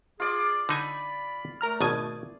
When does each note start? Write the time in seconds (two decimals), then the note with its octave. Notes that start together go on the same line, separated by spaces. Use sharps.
0.20 F4 G#4 D5
0.69 D3 D#4 G#5 B5
1.61 A3 A#4 A#5 F6
1.81 G#1 B2 G#5 A5 D#6 G#6